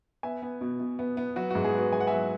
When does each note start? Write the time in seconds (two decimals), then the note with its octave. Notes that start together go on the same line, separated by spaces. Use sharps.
0.23 B3 E5 G#5
0.42 B3
0.61 B2
0.80 B2
0.99 B3
1.17 B3
1.36 F#3 F#4 B4
1.50 G#2 F#4
1.64 G#4
1.74 B3 F#4 B4
1.93 G#2 G#5
2.00 F#5
2.07 F#3 E5 G#5